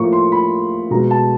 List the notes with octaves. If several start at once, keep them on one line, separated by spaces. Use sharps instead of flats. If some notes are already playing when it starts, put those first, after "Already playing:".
Already playing: A2 F3 A#3 C#6
C6
B5
B2 G#3 B3 A#5
A5